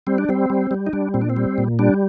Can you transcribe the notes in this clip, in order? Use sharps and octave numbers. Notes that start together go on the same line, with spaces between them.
G3 C4
D4
G3 C4
G3
G3
D#4
G3 D4
A#2 C4
D4
C4
G3
A#2
G3 D4